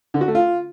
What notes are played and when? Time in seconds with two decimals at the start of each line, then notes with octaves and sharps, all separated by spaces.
0.14 D3
0.21 F#4
0.28 A3
0.35 F4